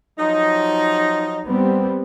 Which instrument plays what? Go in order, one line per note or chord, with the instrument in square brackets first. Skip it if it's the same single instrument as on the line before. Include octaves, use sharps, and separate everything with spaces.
[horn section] F3 F#3 D#4
[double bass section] G3 B3 C4